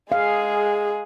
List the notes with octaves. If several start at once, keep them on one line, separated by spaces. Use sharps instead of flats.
G#3 G#4 F5